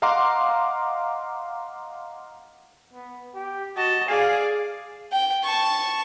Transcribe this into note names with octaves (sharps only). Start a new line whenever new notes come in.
D#5 F5 F#5 A#5 C6 D6
B3
G4
F#4 D#5 A5
G#4 D5 F5 G#5
G5
A5 C#6